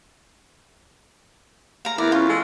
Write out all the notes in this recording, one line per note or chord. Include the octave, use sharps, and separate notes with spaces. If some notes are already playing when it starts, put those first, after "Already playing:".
F5 A#5
E2 E4 A#4 D5
C#4 F4
G#3 A4